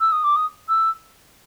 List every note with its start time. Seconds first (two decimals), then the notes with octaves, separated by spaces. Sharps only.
0.01 E6
0.12 D#6
0.24 D6
0.36 D#6
0.69 E6